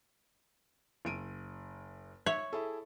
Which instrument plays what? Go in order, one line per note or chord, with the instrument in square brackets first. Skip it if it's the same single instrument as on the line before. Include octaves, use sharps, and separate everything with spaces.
[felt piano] F#1 D7 D#7
[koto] C#5 [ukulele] E5
[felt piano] E4 G#4 A4